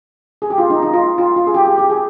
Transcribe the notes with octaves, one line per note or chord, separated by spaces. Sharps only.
G#4
G4
F4
D#4
D#4
F4
F4
F4
G#4
G4
G4
G4
G#4